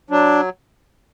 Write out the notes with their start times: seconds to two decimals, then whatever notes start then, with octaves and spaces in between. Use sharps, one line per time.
0.10 F#3 D4